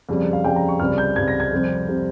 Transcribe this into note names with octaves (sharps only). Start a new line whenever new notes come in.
F2 C#3 G3
F5
F2 C#3 G3 G5
A#5
C#6
C#2 C3 G3 F6
G6
C#2 C3 G3 G#6
A#6
G#6
F2 C3 G3
C3 G3